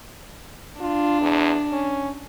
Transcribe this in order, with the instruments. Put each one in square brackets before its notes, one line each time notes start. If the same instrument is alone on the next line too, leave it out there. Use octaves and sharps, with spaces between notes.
[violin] D4 [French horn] F4
[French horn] E2
C#4